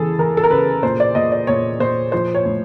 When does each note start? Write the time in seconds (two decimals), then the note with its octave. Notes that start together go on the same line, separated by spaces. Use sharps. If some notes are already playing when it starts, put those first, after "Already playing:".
Already playing: C#3 E3 G#4 A4
0.18 E3 A#4
0.37 A4
0.44 A#4
0.51 C#3 B4
0.83 A#2 C5
1.00 D5
1.15 A#2 D#5
1.32 D5
1.47 A#2 C#5
1.80 A#2 C5
2.12 F3 C5
2.35 C#5
2.45 A2